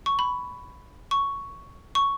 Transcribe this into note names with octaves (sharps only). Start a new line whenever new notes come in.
C#6
B5
C#6
C#6